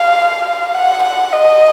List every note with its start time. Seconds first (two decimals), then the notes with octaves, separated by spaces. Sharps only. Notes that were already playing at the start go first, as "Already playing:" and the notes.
Already playing: F5
0.74 F#5
1.03 F#5
1.33 D#5